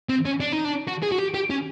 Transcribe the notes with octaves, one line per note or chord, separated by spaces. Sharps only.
C4
C#4
D4
D#4
D4
F#4
G#4
F#4
G4
G4
C#4